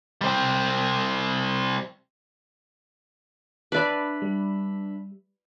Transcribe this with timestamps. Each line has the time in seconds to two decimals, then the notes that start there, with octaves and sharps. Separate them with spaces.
0.21 G3 C4
3.72 D4 B4 D5 E5 B5
4.22 G3